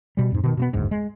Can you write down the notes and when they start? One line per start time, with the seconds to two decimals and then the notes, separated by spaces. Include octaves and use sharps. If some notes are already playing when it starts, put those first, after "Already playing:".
0.17 B2 G3
0.32 F2 G#2
0.44 B2 D#3
0.57 B2 A#3 B3
0.73 F#1 D2 G#2
0.91 G#3